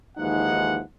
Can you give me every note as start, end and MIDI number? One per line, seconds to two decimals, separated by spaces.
0.18 0.80 39
0.18 0.80 52
0.18 0.80 53
0.18 0.80 56
0.18 0.80 63
0.18 0.80 78